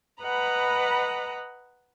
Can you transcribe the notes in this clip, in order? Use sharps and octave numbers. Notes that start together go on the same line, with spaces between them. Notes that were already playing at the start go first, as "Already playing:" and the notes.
B4 D#5 F#5 A#5 B5